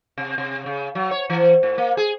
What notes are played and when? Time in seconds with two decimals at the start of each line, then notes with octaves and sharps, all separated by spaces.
0.18 C3
0.38 C3
0.66 C#3
0.95 F#3
1.11 C#5
1.30 E3
1.63 A2
1.78 A#3
1.97 G#4